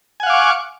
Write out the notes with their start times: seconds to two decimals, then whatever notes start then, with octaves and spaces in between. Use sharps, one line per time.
0.20 G#5
0.23 F#5
0.26 F5
0.30 D6
0.33 C#6